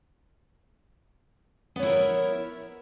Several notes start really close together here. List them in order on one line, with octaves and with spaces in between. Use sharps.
B3 C#5 E4 A#4 E5